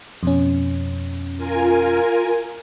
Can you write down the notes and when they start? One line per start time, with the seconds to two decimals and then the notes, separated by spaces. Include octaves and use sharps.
0.23 F2 B2 C#4
1.37 F4 A#4 G#5